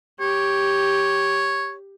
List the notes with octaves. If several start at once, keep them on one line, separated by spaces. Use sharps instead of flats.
G4 C#5